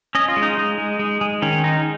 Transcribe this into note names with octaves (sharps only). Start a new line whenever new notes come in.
C#4 D#5
F4
G#3
D#4
G#3
G#3
G#3
G#3
D#3 C#4
G#3 D#4